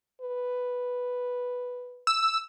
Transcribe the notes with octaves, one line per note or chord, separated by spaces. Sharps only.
B4
E6